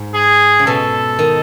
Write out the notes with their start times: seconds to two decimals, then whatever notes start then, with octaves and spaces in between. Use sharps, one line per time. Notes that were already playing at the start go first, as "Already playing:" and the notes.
Already playing: G#2
0.15 G#4
0.59 C#3
0.67 B2 A4
1.19 D#3